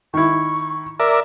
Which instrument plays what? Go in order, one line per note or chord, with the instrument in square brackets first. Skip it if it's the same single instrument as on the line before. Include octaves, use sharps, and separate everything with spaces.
[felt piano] D#3 E4 [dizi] C#6
[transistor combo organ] A#4 D5 E5 [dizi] D6